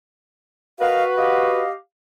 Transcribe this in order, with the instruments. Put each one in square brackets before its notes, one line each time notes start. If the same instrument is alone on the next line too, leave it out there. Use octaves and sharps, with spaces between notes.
[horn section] F#4 B4 [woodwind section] A#4 D#5 F5
[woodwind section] G4 D#5 F5